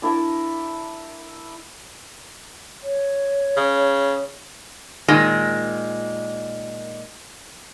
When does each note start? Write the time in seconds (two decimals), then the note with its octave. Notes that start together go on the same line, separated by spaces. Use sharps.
0.02 D4 E4 A#4 A5
2.82 C#5
3.57 C#3
5.08 A#2 D#3 G#3